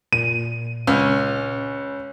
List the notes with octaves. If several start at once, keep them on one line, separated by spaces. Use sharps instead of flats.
A#2 D#7
C#2 C#4